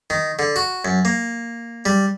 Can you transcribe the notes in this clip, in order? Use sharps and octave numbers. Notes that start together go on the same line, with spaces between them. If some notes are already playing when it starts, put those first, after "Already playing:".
D#3
D3
F#4
F#2
A#3
G3